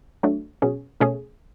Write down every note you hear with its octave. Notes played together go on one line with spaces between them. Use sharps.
F#3 A3 D4
B2 F#3 C#4 G#4
B2 A3 C#4 G#4